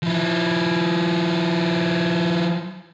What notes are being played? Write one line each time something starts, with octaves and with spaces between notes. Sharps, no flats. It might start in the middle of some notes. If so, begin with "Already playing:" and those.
F3 E4